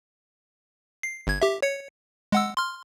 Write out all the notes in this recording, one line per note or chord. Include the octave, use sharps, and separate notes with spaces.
C7
G1 G#6
G4 E5
C#5 C#7
G#3 F#5 E6
C6 F6